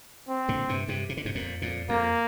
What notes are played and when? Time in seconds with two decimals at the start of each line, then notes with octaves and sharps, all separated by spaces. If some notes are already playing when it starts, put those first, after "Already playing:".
0.28 C4
0.49 A#2 D3
0.68 G2 C3
0.88 G2 C3
1.09 C3
1.17 D3
1.25 G2 C3
1.35 F2 A#2
1.62 F2 A#2
1.89 F2 A#3